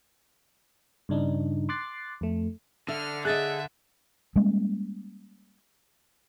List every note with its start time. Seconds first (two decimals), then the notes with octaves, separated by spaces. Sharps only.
1.09 G2 C#3 D4 D#4
1.69 C6 D6 F#6 A6 C7
2.21 F2 A3
2.88 D3 E5 F6
3.25 G#4 D#5 E5 F#6 A6
4.36 G3 G#3 A#3 C#4